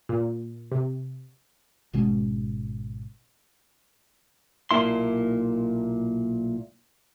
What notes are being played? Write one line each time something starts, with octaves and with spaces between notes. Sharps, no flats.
A#2
C3
G#1 B2 G#3 C#4
B1 A#2 C#3 A#3 E4 C6